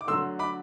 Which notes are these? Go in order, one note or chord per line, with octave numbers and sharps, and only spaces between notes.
D6
D3 F#3 A3 C6 E6
B5 D6